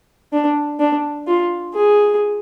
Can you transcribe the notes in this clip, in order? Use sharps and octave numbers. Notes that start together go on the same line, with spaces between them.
D4
D4
F4
G#4